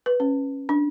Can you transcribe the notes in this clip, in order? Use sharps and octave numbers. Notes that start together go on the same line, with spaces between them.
B4
C#4
D4